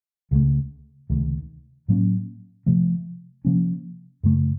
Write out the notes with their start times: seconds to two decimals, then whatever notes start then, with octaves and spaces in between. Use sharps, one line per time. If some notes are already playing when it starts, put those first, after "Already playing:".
0.31 C#2 C#3 F#3 A3
1.10 C#2 C3 D#3 A3
1.88 A2 F#3 A#3 C#4
2.66 C3 F3 A3
3.45 C3 F3 A#3 C#4
4.23 F#2 C#3 A3